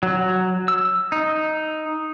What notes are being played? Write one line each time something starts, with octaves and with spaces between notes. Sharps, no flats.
F#3
E6
D#4